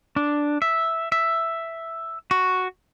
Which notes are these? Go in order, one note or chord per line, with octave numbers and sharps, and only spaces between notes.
D4
E5
E5
F#4